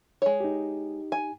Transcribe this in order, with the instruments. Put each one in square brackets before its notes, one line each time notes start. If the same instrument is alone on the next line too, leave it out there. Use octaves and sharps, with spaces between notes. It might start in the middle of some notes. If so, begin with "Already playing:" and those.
[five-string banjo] G#3 C#5
[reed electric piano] D#4 G4
[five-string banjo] G#5